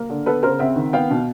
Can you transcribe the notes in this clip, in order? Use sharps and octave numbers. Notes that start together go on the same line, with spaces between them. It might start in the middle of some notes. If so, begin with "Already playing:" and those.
Already playing: A#3
D3
B3 A4 B4
C#3 A#4 C5
C4 E5 F#5
D#3
B3 F5 G5
B2